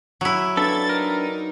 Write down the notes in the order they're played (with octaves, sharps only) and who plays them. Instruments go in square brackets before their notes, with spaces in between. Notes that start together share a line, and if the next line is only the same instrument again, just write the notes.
[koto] F#3 E4
[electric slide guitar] D4 B4 [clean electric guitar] A4 [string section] G#6 A6
[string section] D#4 [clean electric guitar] A#4